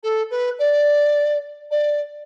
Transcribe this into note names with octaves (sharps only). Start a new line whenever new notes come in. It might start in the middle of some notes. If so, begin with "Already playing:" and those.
A4
B4
D5
D5